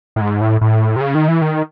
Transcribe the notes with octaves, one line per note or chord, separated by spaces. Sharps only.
A2
G#2
A2
A2
C3
C#3
D#3
E3
D#3